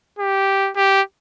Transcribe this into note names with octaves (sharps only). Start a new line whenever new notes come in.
G4
G4